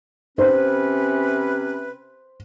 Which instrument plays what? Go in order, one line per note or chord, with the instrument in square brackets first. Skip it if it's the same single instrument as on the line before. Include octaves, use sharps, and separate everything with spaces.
[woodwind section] C3 C#4 B4 [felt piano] C5